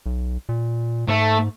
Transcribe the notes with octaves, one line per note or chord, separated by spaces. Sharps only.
B1
A#2
G#2 A3